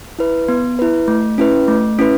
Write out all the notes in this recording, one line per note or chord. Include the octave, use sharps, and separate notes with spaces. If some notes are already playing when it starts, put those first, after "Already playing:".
E4 B4
B3
E4 B4
A3
C#4 E4 B4
A3
C#4 E4 B4